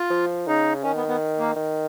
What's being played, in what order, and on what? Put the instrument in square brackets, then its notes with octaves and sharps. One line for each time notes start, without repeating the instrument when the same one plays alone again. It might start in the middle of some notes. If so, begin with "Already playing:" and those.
Already playing: [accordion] F4
[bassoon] F3
[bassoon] C#3 [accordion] D#4
[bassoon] D#3 [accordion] C#4
[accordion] B3
B3
A#3
[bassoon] D#3